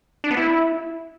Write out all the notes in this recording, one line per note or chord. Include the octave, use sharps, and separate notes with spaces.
D4
B3
E4